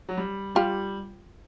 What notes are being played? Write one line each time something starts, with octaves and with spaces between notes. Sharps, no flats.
F#3
G3
G3 F4 G4